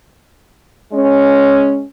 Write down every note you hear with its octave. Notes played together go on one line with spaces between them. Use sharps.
G#3 C#4